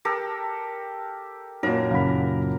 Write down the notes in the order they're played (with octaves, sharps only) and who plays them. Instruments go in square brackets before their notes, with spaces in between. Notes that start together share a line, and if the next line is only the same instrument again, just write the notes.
[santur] G4 A4 A#4
[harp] F#2 A#2 [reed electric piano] D#4 [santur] A#4
[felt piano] F#1 [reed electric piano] F5 F#5 B5